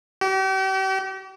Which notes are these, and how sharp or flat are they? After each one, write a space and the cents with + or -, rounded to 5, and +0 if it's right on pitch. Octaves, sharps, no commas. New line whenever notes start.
G4 -40